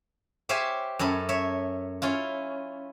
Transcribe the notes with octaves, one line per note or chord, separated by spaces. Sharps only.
G4 C5 C#5 E5 F5 G#5
F#2 C#4 A4 B5
C#5 E5
C#4 E4 F4